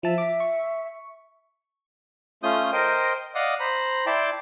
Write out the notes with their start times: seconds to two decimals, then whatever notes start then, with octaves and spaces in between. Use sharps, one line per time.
0.03 F3 E5 A5
0.18 D6 B6
0.40 C#6
2.43 A3 C#4 F4 D#6 G6
2.72 A#4 C5 D#5 G5
3.35 D5 D#5 F5 F#5 D#6
3.60 C5 A#5 B5
4.06 E4 D5 G5 A5 C6